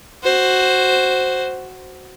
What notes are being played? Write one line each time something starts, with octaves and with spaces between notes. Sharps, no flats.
F#4 C5